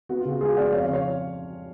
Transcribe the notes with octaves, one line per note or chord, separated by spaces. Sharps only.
B3 F#4
F4
C#3
F#4
G#3 F4 G#4
B3 D5 F#5
F2 C#5 F5
C#5 F5
C#3
C#5 F5